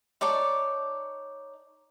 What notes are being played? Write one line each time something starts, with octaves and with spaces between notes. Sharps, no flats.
D#4 C#5 D5 A5